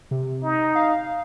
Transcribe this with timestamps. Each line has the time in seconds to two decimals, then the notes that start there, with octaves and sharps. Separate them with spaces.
0.11 C3
0.43 D#4
0.75 F5